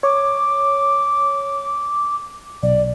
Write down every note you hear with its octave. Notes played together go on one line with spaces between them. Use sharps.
C#5 D6
B1 D5